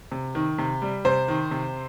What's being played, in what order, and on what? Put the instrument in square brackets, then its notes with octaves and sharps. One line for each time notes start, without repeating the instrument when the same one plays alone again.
[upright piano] C3
D#3
C3
G3
C3 C5
D#3
C3